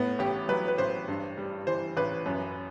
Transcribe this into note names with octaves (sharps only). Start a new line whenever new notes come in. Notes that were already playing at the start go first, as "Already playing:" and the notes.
Already playing: A2 B3
A1 G4
F#3 B4
B4
A1 C5
G2
G3
E3 C5
A1 B4
F#2